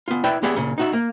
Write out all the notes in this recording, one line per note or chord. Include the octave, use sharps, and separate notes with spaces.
B3 F4
E4 B4 D5 E5 G5
B3 G4 G#4 D5 E5
A#2 C#3
D#4 F#4 E5
A#3